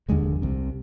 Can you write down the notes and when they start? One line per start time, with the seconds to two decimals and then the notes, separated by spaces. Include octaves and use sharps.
0.09 F1 D#2 D3 G#3
0.42 C2 C3